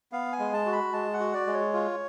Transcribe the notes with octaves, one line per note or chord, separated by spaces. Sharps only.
B3 F5
G#5
G#3
A5
F#4
B5
G#3 A5
F#5
F#4
D5
G#3
C#5
F4